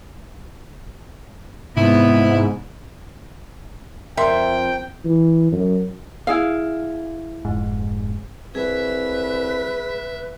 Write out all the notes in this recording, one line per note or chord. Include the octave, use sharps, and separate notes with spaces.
G#2 C3 B3 E4
F2 A#4 E5 G5 C6
E3
F#2
E4 G#4 F5
F1 G#2
C2 G#4 B4 E5